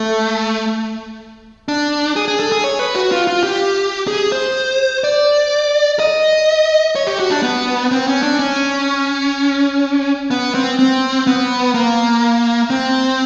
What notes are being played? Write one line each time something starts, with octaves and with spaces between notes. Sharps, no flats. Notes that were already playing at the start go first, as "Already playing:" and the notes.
Already playing: A3
D4
G#4
G#4
A4
G#4
C#5
B4
F#4
F4
F4
G4
G#4
C5
D5
D#5
C#5
G4
F#4
D4
B3
C4
C#4
D4
C#4
B3
C4
C4
B3
A#3
C4